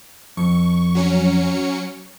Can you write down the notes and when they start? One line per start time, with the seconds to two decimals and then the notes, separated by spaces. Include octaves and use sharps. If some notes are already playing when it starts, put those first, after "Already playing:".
0.37 F2 C#6
0.95 F#3 C#4 C#7